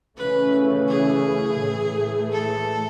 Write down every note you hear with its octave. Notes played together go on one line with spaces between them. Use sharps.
C#3 E3 A3 C#4 B4
G#4
A2 E3 A3
A4